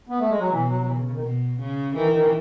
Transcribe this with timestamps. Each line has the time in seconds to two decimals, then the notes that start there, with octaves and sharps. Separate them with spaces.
0.09 B3
0.20 A3
0.29 G#3
0.39 F#3
0.49 B2 E3
0.68 F#3
0.81 F#3
0.86 E3
0.95 C#3
1.05 C#3
1.14 D#3
1.23 B2
1.59 C#3
1.94 D#3 E3
2.13 D#3